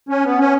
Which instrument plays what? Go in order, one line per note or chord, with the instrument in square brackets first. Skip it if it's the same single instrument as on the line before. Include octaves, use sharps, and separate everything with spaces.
[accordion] C#4
B3
C#4